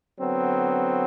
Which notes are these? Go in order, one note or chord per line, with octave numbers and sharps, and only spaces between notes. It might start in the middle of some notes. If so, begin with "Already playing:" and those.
D3 F#3 B3 C4